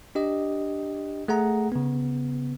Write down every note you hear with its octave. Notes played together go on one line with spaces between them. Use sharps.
D4 G4 D#5
A3 G#4 F#5 A#5
C#3 B3